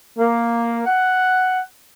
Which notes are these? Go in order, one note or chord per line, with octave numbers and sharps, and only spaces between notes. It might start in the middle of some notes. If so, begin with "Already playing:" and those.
A#3
F#5